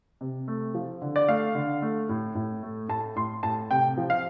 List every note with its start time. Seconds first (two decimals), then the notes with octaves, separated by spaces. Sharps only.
0.21 C3
0.48 A3
0.75 F3
1.02 D3
1.16 D5
1.28 A3 F5
1.55 D3
1.82 A3
2.09 A2
2.35 A2
2.63 A3
2.89 A2 A5
3.16 A2 C6
3.43 A2 A5
3.71 C3 G5
3.97 F3
4.10 F5